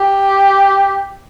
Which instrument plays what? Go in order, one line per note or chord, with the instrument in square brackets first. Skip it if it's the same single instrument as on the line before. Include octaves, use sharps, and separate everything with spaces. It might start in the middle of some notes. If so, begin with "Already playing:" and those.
Already playing: [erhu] G4